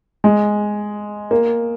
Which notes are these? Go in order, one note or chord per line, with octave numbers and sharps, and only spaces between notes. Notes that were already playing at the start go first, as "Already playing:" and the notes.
G#3
A#3